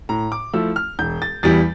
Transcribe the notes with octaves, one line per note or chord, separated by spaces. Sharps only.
A2 A#5
D6
F3 A3 E4 E6
F6
E1 G6
A6
E2 E3 G3 A6